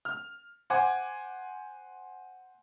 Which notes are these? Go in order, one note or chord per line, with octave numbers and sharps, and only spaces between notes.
F6
C5 F#5 G#5 D6 G#6